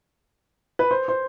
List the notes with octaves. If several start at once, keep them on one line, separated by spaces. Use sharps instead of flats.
B4
C5
C5